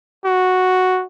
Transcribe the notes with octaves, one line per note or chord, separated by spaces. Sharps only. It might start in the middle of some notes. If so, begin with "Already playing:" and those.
F#4